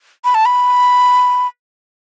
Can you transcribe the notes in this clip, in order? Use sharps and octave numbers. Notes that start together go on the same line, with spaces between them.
B5
A5
B5